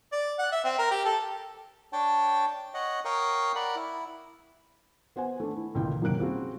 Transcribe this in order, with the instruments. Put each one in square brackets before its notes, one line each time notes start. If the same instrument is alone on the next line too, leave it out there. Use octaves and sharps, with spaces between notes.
[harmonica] D5
F#5
E5
C4
A#4
G4
A4
[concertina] D4 C#5 G5 A5
C#5 D#5 F#5
A#4 C#5 F5 G5 C#6 D#6
A#4 D5 F#5 B5
E4
[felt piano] B3 C5 F#5 G#5
A3 D4
E4
G#1 C#2 A#2 E3 G5
B1 F#2 C3 A#3 F#6 D7
G3 C4 C#4 F4 F#4 G#4